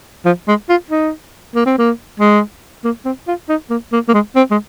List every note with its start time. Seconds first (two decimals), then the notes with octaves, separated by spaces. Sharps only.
0.25 F3
0.48 G#3
0.69 F4
0.91 D#4
1.55 A#3
1.66 C4
1.78 A#3
2.20 G#3
2.84 A#3
3.05 C4
3.27 F4
3.49 D#4
3.70 A#3
3.92 A#3
4.08 A#3
4.14 G#3
4.36 C4
4.51 G#3